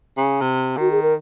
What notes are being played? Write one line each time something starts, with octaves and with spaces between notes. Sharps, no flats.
C#3
C3
D#3 F#4
G#4
A#4